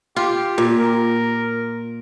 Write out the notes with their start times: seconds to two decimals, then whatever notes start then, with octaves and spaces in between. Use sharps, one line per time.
0.16 F4 G4
0.58 A#2
0.79 A#4